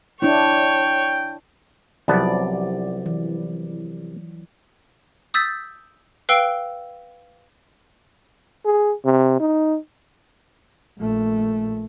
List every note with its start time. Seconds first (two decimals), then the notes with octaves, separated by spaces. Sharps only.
0.22 D4 E4 C#5 G5
2.08 C2 F3 F#3 B3 D5 A5
3.06 E3
5.34 D#6 E6 G6 A6 B6
6.29 B4 F5 G5 E6 D7 G7
8.65 G#4
9.05 C3
9.40 D#4
10.98 A#1 A3